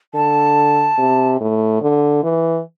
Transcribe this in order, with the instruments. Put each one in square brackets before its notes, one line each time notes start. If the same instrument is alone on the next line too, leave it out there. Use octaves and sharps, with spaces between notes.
[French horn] D3 [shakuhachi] A5
[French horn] C3
A2
D3
E3